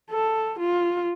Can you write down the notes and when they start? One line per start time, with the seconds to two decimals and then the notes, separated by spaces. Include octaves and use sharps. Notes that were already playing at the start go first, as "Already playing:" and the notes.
0.10 A4
0.59 F4